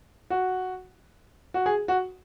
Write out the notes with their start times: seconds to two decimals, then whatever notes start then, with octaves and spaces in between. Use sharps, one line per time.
0.30 F#4
1.54 F#4
1.66 G#4
1.88 F#4